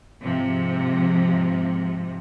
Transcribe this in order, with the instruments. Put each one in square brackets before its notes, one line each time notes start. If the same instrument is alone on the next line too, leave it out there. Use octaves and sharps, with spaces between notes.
[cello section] G#2 C3 F3